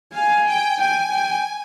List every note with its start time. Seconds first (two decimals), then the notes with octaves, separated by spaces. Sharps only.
0.15 F5 G#5
0.47 G5
0.79 G5 G#5
1.12 G5